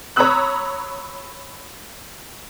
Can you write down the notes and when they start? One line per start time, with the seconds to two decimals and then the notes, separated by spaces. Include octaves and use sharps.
0.16 C#5 A#5 B5 D#6 E6 F#6